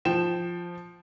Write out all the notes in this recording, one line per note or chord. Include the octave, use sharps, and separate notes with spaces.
F3 G5 E7